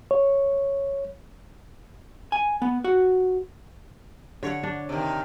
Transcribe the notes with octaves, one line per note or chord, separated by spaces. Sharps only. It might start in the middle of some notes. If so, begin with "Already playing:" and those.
C#5
G#5
B3
F#4
D3 C#5 F#5
D4
C3 D#3